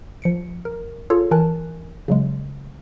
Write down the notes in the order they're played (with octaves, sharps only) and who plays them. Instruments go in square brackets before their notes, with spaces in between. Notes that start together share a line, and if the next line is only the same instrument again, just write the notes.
[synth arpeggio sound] F3 C#7 D7
A#4
F4 G#4 A4 C#5
E3 A#4 G#5 A5 F#6
C#3 F#3 G#3